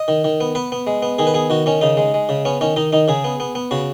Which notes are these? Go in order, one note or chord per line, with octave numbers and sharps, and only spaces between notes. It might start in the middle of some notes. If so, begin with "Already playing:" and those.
Already playing: D#5
D#3
D#3
B3
B3 B4
B3
G#3
B3
D#3 G#4
B4
B3 G#4
D#3 F#4
D#3 C#4
C#3 D#4
G#3
G#3
C#3
B3 C#4
D#3 C#4
D#3 D#4
D#3 D#4
C#3 G#4
B3
B3
B3
C#3 F#4